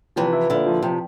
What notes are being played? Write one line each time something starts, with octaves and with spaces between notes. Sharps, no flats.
C3 E3 F3
E4
A#2 D3 E4
F3
C3 F3